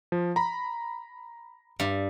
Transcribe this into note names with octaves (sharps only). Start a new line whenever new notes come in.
F3
A#5 B5
G2